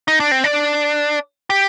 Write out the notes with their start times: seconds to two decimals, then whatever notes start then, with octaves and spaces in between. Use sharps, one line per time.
0.08 D#4
0.20 D4
0.31 C4
0.44 D4
1.50 G4